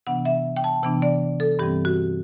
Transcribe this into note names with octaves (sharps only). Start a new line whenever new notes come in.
C3 E3 B3 D4 F#5
E5
G5
A5
C3 E3 B3 D4 G5
D5
A4
G2 E3 G3 C4 G4
F#4